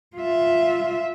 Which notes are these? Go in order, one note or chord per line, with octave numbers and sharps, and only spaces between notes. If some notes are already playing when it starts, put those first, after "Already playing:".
F4 E5